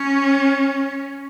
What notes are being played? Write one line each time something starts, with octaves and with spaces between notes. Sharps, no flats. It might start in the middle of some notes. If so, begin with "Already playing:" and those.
Already playing: C#4